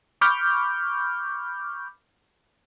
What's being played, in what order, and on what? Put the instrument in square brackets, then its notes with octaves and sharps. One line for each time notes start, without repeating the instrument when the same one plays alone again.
[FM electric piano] B5 C#6 D6 F6 G6